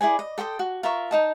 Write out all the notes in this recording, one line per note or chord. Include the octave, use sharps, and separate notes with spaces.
E4 G#4 D5 G#5
D#5
A4 G5 C6 D#6
F#4
F4 A#4 E5 C#6
D#4 D#5 A5